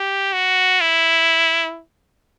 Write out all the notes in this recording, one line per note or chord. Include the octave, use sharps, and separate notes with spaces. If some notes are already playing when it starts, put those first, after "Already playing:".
Already playing: G4
F#4
E4